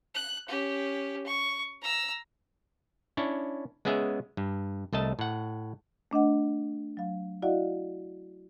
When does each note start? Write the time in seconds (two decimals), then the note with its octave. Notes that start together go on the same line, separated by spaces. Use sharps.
0.15 F#6
0.48 C#4 G4
1.26 C#6
1.81 A#5 E6
3.17 C#4 D4 E4 C#5
3.85 G#3 B3 C#4 G#4 E5
4.37 G2
4.93 C2 A3 D#5 A5
5.19 A2 F#5
6.11 A3 D4 D#5 F#5
6.97 F#3 F5
7.42 E4 F#4 D5 D#5 F5 F#5